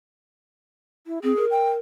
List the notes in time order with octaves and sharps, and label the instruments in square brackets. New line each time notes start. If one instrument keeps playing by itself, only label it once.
[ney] E4
[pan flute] C4 [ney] G#4
[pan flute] A#4
[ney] G5